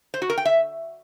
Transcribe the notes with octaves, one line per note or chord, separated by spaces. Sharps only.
C5
F#4
A#4
G5
E5